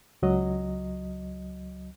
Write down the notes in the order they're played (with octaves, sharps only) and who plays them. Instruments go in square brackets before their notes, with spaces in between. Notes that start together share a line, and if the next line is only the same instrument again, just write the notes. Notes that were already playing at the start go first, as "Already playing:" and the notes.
[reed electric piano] C#2 F#3 D#5